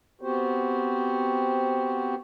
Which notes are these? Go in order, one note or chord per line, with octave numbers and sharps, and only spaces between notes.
B3 C4 F#4 G4 C5